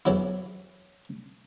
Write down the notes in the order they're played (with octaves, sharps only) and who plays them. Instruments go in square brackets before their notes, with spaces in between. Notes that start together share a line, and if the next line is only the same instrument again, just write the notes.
[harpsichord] E2 F#3 E4